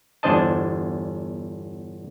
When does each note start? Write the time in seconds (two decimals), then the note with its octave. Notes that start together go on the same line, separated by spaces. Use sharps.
0.23 G1 E2 D4 C5 D#5 A5